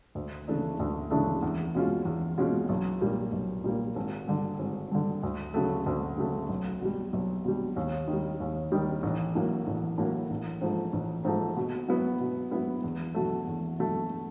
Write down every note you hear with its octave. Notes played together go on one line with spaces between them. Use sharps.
D2
C#3 E3 A3 D4
D2
C#3 E3 A3 D4
E2
B2 G#3 C#4 F4
E2
B2 G#3 C#4 F4
B1
A#2 G3 A#3
B1
A#2 G3 A#3
G#1
G2 D3
G#1
G2 D3
D2
C#3 F#3 A3
D2
C#3 F#3 A3
B1
B2 G3
B1
B2 G3
D#2
D#3
G3
D#2
D#3 G3
A1
A2 F#3 A#3
A1
A2 F#3 A#3
A1
G#2 F3 A3
A1
G#2 F3 A3
B2
F#3 B3 E4
B2
F#3 B3 E4
E2
B2 F#3 A3
E2
B2 F#3 A3